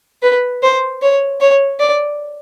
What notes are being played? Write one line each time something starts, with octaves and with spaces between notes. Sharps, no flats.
B4
C5
C#5
C#5
D5